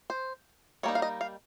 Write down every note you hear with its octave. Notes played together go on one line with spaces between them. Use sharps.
C5
G3 A#3 D#4 C#5
F5
D#5
F5